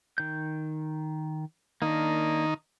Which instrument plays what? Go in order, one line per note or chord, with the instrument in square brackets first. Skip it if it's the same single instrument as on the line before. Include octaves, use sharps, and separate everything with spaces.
[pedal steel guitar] D#3 G6
[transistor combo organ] D#3 D#4 [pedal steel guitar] A#3 D4